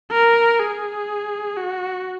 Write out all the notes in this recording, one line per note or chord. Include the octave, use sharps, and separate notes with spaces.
A#4
G#4
F#4